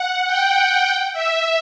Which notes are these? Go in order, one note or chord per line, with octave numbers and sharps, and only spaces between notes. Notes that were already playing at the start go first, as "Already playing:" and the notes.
Already playing: F#5
G5
G5
E5